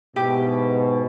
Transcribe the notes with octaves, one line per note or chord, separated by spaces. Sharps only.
G#2 B2 E4 G4